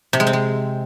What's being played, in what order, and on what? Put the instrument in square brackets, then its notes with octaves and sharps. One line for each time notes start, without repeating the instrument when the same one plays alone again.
[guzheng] C3
G#3
C4
G#3